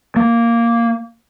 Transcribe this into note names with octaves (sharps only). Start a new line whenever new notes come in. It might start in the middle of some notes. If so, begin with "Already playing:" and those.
A#3